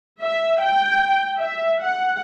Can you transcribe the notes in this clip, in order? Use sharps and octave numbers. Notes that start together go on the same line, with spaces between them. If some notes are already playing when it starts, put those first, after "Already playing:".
E5
G5
E5
F#5